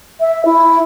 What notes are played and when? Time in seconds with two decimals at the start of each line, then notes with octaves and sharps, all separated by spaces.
0.20 E5
0.45 E4